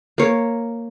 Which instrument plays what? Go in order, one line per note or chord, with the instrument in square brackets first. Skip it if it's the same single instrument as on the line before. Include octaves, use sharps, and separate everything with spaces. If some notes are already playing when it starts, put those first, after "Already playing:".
[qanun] A#3 C#5